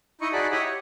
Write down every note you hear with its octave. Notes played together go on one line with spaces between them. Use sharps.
D#4 E4 D#5 C#6
D#4 F#4 G#4 D5 A5 B5
E4 G4 C#5 D#5 F#5 B5
C#5